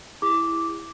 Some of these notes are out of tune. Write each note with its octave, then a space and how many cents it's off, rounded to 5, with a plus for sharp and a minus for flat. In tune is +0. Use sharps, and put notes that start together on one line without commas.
E4 +0 G#4 -40 D6 -5